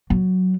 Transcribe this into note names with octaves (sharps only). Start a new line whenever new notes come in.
F#3